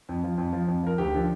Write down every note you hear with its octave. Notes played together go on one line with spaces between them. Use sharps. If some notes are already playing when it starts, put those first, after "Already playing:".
F2
F3
F2
F3
F2
F3 A#4
D2 G4
D3 F3